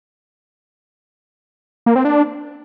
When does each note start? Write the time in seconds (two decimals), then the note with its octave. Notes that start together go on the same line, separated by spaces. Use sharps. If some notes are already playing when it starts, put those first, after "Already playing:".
1.86 A#3
1.96 C4
2.05 D4